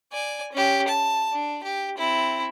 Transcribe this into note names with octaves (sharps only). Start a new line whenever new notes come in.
D5 G#5
C#4 G4
A5
D4
G4
C4 E4